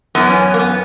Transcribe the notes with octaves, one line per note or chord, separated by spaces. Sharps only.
F#2 E3 B3
C#4
A#3
B3